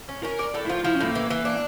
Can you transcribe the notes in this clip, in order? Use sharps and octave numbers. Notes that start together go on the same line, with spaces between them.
C#4
C#4 A#4
D5
A2 A4
E4
F3 F4
F3 E4
C#4
A2 A#3
E3
E3
D4